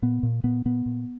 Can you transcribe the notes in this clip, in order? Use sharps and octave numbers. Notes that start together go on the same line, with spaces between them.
A#2 B3
A#2
A#2 B3
A#2 B3
A#2